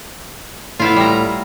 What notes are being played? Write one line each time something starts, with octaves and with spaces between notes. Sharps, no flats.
A2 B3 E4 F4
G3 A#5